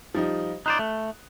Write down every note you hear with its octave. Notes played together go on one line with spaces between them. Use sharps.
F3 G3 D#4
D#4 C5 D5 F#6 F7
A3